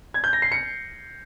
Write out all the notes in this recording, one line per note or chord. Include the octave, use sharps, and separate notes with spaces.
G#6
G6
A#6
C7
C#7